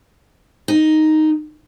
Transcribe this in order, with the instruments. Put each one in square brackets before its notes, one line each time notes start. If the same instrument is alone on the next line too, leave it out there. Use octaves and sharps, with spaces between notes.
[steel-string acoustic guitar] D#4